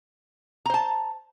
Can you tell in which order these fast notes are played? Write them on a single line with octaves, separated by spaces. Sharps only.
A#5 C5 A5